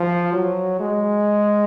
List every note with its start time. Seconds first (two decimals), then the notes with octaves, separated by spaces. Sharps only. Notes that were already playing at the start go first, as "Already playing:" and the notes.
Already playing: F3
0.33 F#3
0.80 G#3